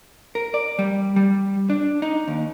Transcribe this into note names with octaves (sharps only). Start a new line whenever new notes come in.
A#4
D5
G3
G3
D4
D#4
D#2